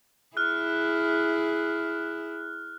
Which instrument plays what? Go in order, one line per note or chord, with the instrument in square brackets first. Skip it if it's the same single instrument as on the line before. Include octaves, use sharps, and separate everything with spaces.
[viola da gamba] E4 G#4 [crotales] F6 F#6